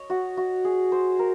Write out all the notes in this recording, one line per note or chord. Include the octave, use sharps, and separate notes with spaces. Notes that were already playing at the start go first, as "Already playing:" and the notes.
Already playing: C#5 D#5
F#4
F#4
G#4
C5
A#4